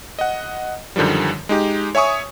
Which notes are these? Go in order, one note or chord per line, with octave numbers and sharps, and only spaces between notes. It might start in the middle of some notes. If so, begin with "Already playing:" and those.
D#5 F#5
F#2 D3 D#3 F3 G3
G#3 D#4 G4
C#5 E5 G#5 C#6 D#6